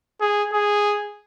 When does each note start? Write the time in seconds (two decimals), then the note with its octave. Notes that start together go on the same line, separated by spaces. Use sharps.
0.21 G#4
0.53 G#4